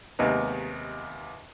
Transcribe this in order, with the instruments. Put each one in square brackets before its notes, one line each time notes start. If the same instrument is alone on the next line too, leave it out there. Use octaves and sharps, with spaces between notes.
[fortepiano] D#2 C3 G#3 B3 D#4